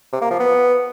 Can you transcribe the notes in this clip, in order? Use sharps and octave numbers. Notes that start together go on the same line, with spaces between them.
C3
A#3
F3
B3